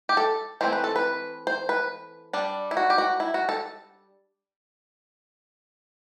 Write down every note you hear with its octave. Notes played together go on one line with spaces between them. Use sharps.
G4
A4
E3 A3 C4 C5
B4
A4
B4
C5
B4
G3 D4
E4
F#4
G4
F#4
E4
F#4
A4